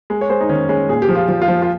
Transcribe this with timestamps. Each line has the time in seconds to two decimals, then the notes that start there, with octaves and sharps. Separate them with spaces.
0.10 G#3
0.21 C#5
0.30 G#3 C5
0.41 D#4
0.49 D#3 C#4
0.69 G#3 C#4
0.89 A#2 G#4
1.02 G4
1.09 F3
1.15 F4
1.28 F3
1.42 F4
1.48 F3
1.62 F4